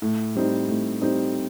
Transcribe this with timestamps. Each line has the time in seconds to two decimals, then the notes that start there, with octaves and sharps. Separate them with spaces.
0.02 A2
0.35 G3 C4 D#4
0.68 A2
1.01 G3 C4 D#4